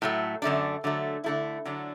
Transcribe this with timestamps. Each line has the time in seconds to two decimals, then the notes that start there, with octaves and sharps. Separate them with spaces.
0.02 A2 F#3 A3
0.42 F#2 D3 A3 D4
0.84 D3 F#3 A3
1.24 D3 A3 E4
1.65 D3 F#3 D4